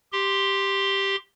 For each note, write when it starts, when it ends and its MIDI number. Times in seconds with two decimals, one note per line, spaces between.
0.13 1.16 67
0.13 1.16 84